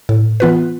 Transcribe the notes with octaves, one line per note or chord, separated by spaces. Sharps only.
A2
E3 B3 F4 B4